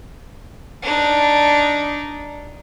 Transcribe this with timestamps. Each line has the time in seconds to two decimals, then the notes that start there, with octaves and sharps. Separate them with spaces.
0.83 D4 D#4